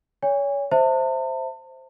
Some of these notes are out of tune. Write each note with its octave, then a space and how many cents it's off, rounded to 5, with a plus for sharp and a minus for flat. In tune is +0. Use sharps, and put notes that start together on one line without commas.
C#5 +30 G#5 -35
C5 +0 E5 +0 A5 +40